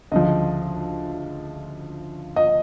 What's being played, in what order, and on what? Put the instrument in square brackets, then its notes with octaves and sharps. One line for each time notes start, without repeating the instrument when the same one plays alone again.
[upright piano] D2 C#3 F3 D#5
D#5